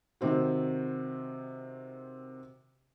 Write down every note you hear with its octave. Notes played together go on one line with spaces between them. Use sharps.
C3 D#3 C4 F#4